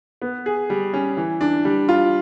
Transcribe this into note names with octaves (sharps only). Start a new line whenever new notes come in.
B3
G#4
G3
C#4
E3
D4
G3
F4